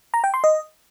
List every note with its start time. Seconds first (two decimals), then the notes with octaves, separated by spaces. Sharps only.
0.14 A#5
0.24 G5
0.34 C6
0.44 D#5